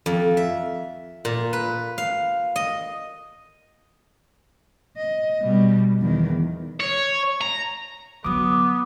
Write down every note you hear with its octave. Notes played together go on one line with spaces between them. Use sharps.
F2
E5
A#2
B4
F5
D#5
D#5
B2 G3
E2 D#3
C#5
A#5
D3 F#3 B3 D6 D#6